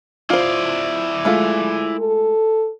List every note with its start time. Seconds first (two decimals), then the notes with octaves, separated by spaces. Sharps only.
0.30 E4 F4 C5 D5
1.25 G#3 A3 F4
1.99 A4